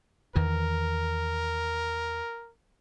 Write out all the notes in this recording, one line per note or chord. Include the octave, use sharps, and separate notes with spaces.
E2 D#3 E3 A#4